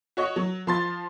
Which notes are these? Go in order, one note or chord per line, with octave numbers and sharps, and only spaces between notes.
F#4 C#5 D#5
F#3
F3 C6 A6